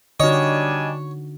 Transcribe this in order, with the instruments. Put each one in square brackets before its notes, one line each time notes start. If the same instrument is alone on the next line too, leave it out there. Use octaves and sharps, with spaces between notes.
[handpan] D3 D#4 F#4 [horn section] G3 D4 G#5 [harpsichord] C#5 [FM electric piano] D#5